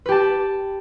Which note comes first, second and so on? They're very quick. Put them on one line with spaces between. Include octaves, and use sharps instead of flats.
B4 G4 A5